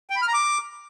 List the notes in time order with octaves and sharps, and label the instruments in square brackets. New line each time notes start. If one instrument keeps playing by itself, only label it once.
[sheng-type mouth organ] G5
B5
F6
A#5
D6